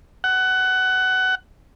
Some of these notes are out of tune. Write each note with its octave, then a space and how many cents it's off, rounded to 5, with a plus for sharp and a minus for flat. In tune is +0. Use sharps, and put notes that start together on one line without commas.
F#5 +20